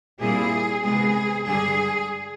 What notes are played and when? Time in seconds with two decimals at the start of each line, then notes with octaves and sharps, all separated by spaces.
0.20 A#2 G3 C4 E4 G#4
0.83 C3 D#3 G#3 B3 G#4
1.45 G2 D3 G3 G#4